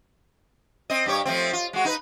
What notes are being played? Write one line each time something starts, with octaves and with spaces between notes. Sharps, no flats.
C4 D#5
G2 G4 C#5
F3 A3 C4
F4
G#3 F#4
D#4 B4